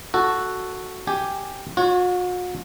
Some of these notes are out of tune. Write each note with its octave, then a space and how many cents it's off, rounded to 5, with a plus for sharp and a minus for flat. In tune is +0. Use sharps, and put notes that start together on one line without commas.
F#4 +0 A4 +0
G4 +0 G#5 +0
F#4 -45 C#5 +10